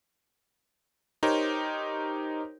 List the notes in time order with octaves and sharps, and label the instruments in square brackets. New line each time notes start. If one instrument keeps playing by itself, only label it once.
[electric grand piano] D#4 G4 A#4 C5 C#5